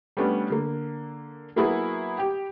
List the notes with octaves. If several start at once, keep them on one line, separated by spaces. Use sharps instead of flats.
G3 A3 B3 C#4 D4
D3 A#3
F#3 A#3 B3 E4 F#4 G#4
G4 G5